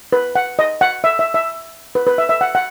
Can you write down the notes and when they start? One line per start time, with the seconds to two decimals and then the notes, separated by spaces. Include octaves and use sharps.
0.13 B4
0.35 F#5
0.59 D#5
0.81 F#5
1.04 E5
1.19 E5
1.34 E5
1.95 B4
2.07 B4
2.18 E5
2.29 E5
2.41 F#5
2.55 F#5